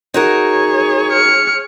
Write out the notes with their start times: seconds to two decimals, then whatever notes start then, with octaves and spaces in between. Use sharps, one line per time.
0.14 D#4 F#4 G#4 A#4 C#5
1.11 F6 C#7